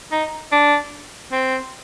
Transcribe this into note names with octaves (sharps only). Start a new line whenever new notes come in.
D#4
D4
C4